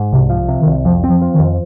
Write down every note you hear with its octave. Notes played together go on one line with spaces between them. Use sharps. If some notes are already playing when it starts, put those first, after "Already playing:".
Already playing: G#2
C2 C3
F3
C3
D#3
C2
F2 F3
C4
F3
F3
D#3
F2